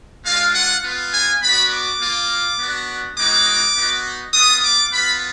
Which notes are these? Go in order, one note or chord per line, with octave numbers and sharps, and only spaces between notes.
G#3 D4 F4 F5
F#5
B3 F4
G#5
B3 D4 F#4 B5
D6
A#3 F4
B3 D4 F#4
G#3 B3 D#4 F#4 D6
B3 D#4 F#4
B3 F4 D#6
D6
B3 F4 B5